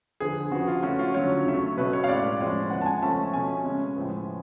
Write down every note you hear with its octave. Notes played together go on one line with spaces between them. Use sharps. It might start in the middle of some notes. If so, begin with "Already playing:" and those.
D3 F3 B3 G#4
C#3 F3 B3 F#4
F4
F3 A3 C#4 F#4
F4
D3 F#3 C#4 C#5
C#3 F#3 A3 C#4
B2 F#3 A3 C#4 B4
C#5
F5
A2 G#3 C#4 D5
A2 F3 G#3 C#4
C#3 G#3 B3 F#5
A5
G#5
F3 A3 C#4 A5
B2 A3 C#4 G#5
C#3 G#3 C#4
A2 F3 G#3 B3